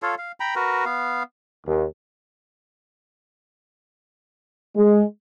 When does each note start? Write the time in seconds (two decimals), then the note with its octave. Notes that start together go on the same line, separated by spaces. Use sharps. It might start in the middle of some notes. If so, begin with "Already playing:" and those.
0.02 F4 A4 C#5 F5
0.18 F5
0.40 G5 A#5 B5
0.56 F#4 A#4 B4
0.85 B3 F5
1.66 D#2
4.76 G#3